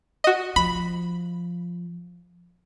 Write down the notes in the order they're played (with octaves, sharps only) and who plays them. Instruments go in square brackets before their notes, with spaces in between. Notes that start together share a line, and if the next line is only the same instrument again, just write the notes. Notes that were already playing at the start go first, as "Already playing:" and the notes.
[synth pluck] F#4 D#5
[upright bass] F3 [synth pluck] B5